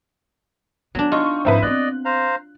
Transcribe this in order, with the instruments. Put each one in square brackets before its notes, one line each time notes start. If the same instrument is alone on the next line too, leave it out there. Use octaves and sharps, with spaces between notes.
[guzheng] F#3 D4 [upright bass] B3
[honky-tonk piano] D#4 C#6 [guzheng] F4
[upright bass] G#2 F3 [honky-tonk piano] C4 E4 B4 [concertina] D#4
[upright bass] B3 C4 [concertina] D5 D#5 [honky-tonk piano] F#6
[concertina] C5 F5 A#5